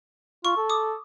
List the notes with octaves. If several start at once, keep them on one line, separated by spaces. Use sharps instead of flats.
F4 C#6
A4
D6 D#6